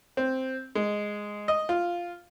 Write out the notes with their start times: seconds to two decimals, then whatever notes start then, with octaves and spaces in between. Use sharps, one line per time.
0.17 C4
0.75 G#3
1.48 D#5
1.69 F4